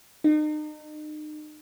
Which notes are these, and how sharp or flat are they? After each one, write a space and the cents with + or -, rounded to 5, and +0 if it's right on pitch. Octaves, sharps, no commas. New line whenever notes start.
D#4 -35